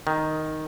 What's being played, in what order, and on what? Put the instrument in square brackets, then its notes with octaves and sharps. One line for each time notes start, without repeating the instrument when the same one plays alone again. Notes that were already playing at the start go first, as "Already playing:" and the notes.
[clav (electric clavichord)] D#3